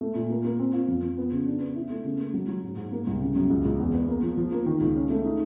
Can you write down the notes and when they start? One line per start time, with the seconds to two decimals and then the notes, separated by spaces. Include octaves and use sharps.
0.01 A3
0.15 A#2
0.30 A#3
0.45 A#3
0.59 C4
0.73 F4
0.88 F2
1.02 F3
1.17 B3
1.32 C#3
1.46 D4
1.61 B3
1.76 E4
1.90 A3
2.04 C#3
2.19 A#3
2.34 F#3
2.48 F#3
2.63 G#2
2.77 G#2
2.92 A#3
3.07 C2
3.21 C#3
3.35 F#2
3.50 C#2
3.65 C#2
3.79 E2
3.93 B3
4.08 A#3
4.23 F3
4.37 F3
4.52 A#3
4.66 D#3
4.81 C#2
4.95 C#4
5.10 A3
5.25 D#4